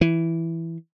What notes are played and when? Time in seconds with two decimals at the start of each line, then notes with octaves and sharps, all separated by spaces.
0.01 E3